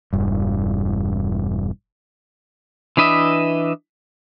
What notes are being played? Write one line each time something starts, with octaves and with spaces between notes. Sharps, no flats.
E1 G2
E3 D4 B4 D#5 E5